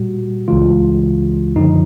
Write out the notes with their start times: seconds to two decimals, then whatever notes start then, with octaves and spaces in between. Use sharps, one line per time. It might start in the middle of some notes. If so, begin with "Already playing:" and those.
Already playing: A#2 G3 F#4
0.48 C#2 C#3 E3 G#3 F4
1.56 F#2 D3 F3 D#4